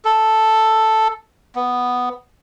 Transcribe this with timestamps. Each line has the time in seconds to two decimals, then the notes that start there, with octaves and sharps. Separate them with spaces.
0.05 A4
1.56 B3